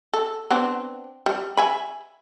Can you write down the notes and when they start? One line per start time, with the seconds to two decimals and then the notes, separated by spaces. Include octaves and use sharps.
0.13 A4
0.50 B3 C4 D4
1.26 G3
1.57 E5 G#5 B5